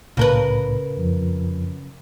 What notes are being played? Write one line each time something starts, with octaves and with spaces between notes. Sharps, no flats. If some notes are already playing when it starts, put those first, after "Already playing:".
C2 A2 C#3 A#4 B4
F2 F3